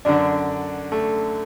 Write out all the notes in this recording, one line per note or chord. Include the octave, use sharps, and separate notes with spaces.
F#2 D3 D4
A3